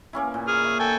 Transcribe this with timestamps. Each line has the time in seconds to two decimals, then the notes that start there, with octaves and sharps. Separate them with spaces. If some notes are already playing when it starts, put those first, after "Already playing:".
0.13 A#3 C#4 E4
0.34 A#2
0.48 G#4 F6
0.64 E5
0.79 A4 G5 G#5